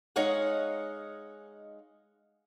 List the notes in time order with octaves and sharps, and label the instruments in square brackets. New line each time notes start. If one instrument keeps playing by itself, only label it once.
[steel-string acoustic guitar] G#3 D#4 C#5 D#5 F5 F#5